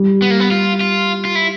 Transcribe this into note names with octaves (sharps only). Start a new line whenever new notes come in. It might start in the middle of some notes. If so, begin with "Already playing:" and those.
Already playing: G3
B3
A#3
B3
F4
F4
F4
E4